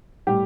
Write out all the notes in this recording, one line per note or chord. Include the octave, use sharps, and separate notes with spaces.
A2 G3 G4